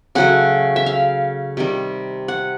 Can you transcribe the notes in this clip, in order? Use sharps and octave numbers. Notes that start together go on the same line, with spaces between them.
C#3 F#3 A3 F#5
E5
F5
C3 D#3 G3
F#5